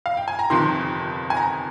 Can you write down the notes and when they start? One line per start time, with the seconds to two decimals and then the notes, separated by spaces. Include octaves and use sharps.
0.06 F5
0.17 G5
0.28 G#5
0.39 A#5
0.50 G1 F2 C3 D#3 C6
1.30 G#5
1.37 A#5